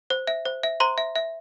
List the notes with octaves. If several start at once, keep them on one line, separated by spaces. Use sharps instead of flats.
C5
E5
C5
E5
C5 A#5 C6
E5
E5